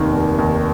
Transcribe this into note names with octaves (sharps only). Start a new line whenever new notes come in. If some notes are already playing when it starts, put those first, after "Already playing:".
Already playing: F1 D#2 D#3
F1
D#2